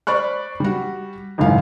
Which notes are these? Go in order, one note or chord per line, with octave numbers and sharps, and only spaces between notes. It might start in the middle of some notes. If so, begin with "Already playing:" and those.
C5 D5 B5 C#6 F#6
G3 F#4
G#1 C#2 F#2 A2 F5